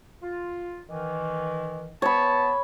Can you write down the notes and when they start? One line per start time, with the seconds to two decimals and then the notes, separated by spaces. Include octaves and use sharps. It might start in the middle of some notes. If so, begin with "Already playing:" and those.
0.23 F4
0.89 D#3 E3
2.02 B3 C#5 A5 B5